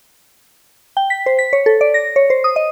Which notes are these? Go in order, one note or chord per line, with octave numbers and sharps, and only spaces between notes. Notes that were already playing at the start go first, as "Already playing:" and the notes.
G5
B6
C5
B6
C#5
A4
D5
A#6
C#5
C5
D#6
D#5